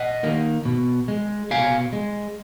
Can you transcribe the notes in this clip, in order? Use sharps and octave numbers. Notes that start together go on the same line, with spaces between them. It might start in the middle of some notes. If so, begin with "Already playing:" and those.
Already playing: D#5 F#5
D#3 A#3
B2
G#3
B2 F5 G#5
G#3